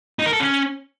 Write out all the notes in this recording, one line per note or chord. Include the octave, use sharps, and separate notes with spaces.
D#4
A#4
A4
C#4